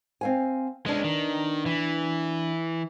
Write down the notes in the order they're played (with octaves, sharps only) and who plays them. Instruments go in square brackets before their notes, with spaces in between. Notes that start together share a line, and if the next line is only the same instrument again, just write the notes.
[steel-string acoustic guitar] C4 F5 G#5
[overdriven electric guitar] G#3 C#4 [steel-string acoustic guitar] B3 D4
[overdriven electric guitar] D#3
E3